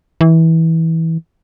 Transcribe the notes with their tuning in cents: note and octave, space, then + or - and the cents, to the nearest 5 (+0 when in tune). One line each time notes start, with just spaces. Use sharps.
E3 -20